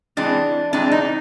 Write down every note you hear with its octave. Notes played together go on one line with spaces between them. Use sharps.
E3 G#3 C4 D4
E3 G#3 C4 D4
D#4